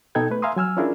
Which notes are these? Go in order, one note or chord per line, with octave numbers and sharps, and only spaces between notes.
B2 B3 D#4 A4 G5 G#6
A3 B4
E5 F5 G#5 A#5 C6 D#6
F#3 G#5 E6 F6
C#4 D4 E4 F4 G#4 A#4